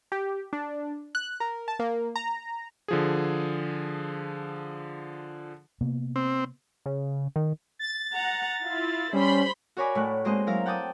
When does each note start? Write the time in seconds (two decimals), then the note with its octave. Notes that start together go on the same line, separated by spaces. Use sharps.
0.12 G4
0.53 D4
1.15 F#6
1.40 A#4
1.68 A5
1.79 A#3
2.16 A#5
2.88 D3 F3 G#4
5.81 C3 A#3 B3
6.16 C4
6.86 C#3
7.36 D#3
7.79 A6
8.16 F#5 A#5
8.65 E4 F4 F5
9.13 G3 C#4 C5 B5 C6
9.77 F#4 A#4 C#5 G#5 B5 D6
9.95 A2 A3 F#6
10.25 G#3 A#3 C4 F#4 C5 D#5
10.47 F#3 E4 A#4 F5 A#5
10.66 F#5 G5 A5 D6 D#6